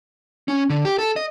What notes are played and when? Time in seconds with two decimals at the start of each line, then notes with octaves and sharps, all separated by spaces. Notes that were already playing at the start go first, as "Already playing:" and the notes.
0.48 C#4
0.70 D3
0.85 G4
0.99 A4
1.16 D#5